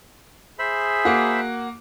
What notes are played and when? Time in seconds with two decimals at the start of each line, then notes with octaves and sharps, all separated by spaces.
0.59 G#4 C5 E5 B5
1.05 A#3 F#4